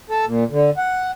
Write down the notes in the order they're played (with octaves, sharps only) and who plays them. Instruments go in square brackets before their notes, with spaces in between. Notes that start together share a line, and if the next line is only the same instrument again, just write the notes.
[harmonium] A4
A#2
D3
F#5